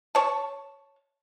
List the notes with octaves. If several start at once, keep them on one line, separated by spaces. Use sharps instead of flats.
C#5 A5